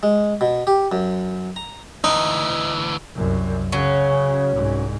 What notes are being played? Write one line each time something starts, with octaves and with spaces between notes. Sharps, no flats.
G#3
B2
G4
F#2
A#5
D2 E3 D#4
C2 F#2
C#3 F#3 C#4
C2 G#2